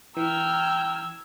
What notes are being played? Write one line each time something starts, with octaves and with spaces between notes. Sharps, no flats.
E3 G5 A#5 E6 F6 G#6